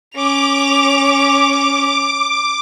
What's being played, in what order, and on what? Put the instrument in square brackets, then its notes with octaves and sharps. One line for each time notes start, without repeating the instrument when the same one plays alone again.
[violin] C#4 F7 [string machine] D6